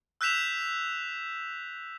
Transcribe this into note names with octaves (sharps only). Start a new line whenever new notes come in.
E6 F#6 G6 B6 E7 F7